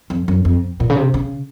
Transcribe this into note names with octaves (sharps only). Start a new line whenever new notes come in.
F2
F#2
F2
A#2
C#3
C3
C#3